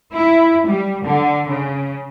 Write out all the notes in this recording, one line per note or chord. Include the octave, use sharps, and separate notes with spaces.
E4
G3
D3
C#3